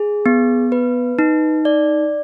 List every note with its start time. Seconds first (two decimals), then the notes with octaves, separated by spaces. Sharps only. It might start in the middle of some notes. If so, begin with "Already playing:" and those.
Already playing: G#4
0.26 B3
0.72 B4
1.19 D#4
1.65 D5